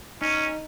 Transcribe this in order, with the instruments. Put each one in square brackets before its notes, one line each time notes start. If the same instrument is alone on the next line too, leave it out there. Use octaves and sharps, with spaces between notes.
[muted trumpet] C#4 [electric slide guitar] D#4